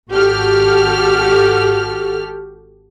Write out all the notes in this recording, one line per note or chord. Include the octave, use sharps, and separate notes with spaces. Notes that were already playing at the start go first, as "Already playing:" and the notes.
G#1 F#4 G4 A4 F6